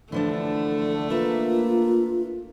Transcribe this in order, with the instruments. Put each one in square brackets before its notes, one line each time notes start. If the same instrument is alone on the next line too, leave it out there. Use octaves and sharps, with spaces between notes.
[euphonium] D3 [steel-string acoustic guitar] E3 F3 D4 [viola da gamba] A3
[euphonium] A#3 [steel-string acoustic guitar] D4 B4 E5 [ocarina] F4